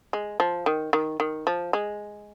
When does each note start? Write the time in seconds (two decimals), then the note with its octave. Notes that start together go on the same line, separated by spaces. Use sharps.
0.13 G#3
0.40 F3
0.66 D#3
0.93 D#3
1.20 D#3
1.47 F3
1.73 G#3